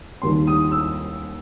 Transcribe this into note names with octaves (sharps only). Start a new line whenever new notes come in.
D#2 D#3 G3 C6
D#6
E6